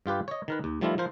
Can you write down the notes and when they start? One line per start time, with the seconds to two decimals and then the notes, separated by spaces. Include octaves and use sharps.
0.06 G2 F4 G4 B4
0.28 C#5 D#5
0.48 D#3 A#4 B4
0.64 D#2
0.81 D#3 F3 G3 A3 E4 F4
0.98 F3 A#4 C5